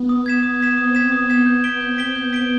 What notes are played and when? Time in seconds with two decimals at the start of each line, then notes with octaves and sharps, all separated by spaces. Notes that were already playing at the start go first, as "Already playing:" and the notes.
Already playing: B3
0.09 D#6
0.26 G#6 B6 E7
0.43 D#6
0.60 G#6 B6 E7
0.77 C4 D#6
0.95 G#6 B6 E7
1.12 B3 D#6
1.30 G#6 B6 E7
1.46 B3 G6
1.64 B6 D7 G7
1.81 C4 G6
1.98 B6 D7 G7
2.15 B3 G6
2.33 B6 D7 G7